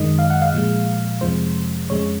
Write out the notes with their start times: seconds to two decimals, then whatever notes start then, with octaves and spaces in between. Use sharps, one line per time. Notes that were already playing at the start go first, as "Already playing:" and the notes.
Already playing: F#2 D#3 G#3 D#5
0.19 F5
0.30 F#5
0.42 F5
0.53 A#2 F3 G#3
1.21 F2 C3 F3 G#3 C5
1.90 F2 C#3 G#3 C#5